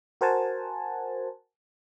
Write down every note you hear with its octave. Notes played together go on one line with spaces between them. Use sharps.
F#4 A#4 C5 F#5 G#5 A5